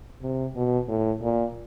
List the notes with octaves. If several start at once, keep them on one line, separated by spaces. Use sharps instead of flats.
C3
B2
A2
A#2